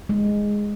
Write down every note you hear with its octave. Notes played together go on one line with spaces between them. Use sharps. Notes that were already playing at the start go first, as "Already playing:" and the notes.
G#3